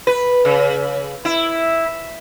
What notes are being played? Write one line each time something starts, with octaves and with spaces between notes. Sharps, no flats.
B4
C#3
E4